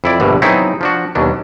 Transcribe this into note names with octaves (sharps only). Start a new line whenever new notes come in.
F2 E4 D5
A#1 G2 B2 D3
F#3 B3 C4 D#4 E4 G#4
F3 D4 F#4
D#2 B2 F#3 D4